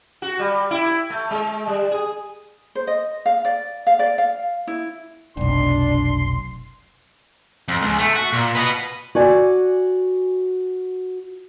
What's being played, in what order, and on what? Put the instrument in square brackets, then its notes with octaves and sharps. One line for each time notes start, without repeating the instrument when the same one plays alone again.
[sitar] F#4
G3
E4
A3
G#3
G3
G#4
[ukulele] C5
D#5
F5
D5
F5
D5
F5
E4
[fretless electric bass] F1 B1 [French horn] D4 [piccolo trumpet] C6
[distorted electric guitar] F2
C#2
A3
F#4
A#2
B4 D#5
[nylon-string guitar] F#4 D5 G#5